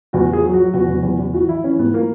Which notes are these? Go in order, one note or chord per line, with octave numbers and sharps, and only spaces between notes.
E2 F#4
E2 G#4
F#3
F#4
F#3
E2 F#4
E2
E2
E2
E3 F#4
E3 E4
E3 C#4
G#2 B3
A#3